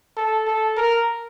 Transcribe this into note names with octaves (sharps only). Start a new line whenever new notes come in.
A4
A4
A#4